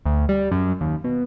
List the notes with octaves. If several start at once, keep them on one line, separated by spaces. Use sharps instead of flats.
D2
G3
F#2
D#2
B2